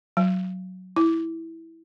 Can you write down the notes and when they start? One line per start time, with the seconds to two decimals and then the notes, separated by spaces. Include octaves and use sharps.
0.17 F#3
0.96 E4